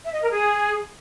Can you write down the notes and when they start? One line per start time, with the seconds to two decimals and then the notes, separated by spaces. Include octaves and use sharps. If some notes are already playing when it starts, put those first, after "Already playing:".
0.03 E5
0.12 D#5
0.21 A#4
0.30 G#4